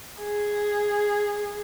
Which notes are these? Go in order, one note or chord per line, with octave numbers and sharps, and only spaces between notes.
G#4